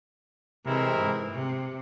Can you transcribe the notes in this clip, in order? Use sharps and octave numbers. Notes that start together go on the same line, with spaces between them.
C3 E3 G#3 C4 E4 A#4
G#2
C3